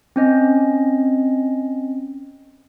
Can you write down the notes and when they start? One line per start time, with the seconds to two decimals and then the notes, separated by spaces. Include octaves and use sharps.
0.16 C4 C#4 D#5